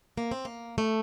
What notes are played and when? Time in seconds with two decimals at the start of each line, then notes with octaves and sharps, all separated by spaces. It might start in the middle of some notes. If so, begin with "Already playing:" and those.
0.18 A#3
0.31 C4
0.45 A#3
0.78 A3